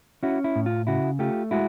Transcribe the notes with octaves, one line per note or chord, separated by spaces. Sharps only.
C#4 E4 F#4
E4
A2
F4
C#3 E4 F#4
A3 F4 G4
G#3 E4 F#4